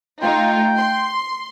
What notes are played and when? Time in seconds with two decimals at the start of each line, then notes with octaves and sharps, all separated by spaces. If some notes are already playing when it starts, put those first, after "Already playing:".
0.22 A3 D#4 F4 G5
0.76 C6